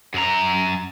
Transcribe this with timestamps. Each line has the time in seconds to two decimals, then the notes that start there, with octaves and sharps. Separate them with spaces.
0.14 F#2 A#5